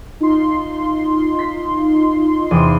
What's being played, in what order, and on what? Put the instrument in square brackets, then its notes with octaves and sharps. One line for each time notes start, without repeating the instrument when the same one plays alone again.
[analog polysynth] D#4 F4 C6
[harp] B6
E2 C3 D#7